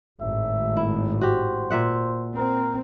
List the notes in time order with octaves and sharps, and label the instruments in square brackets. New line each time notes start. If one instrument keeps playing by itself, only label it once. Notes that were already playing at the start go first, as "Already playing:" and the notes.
[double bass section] G#1 A2 [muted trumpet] E5
[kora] E4
[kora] F#4 G4 [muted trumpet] C5
[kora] A#2 E5 F#5
[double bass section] C4 [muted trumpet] A#4